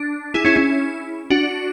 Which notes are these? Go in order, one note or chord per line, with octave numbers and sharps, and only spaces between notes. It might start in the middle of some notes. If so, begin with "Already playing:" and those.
Already playing: D4
E4 G#4
C#4 E4
C#4 E4
D4 F#4